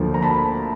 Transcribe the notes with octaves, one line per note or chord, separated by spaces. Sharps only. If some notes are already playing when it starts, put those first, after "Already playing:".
Already playing: D2 D3 F3 A#3
A#5
A5 B5